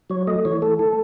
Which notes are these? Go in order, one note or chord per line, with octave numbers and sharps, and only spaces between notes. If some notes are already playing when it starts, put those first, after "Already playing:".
F#3 C#5
A3 D#5
E3 C#5
A3 A4
A4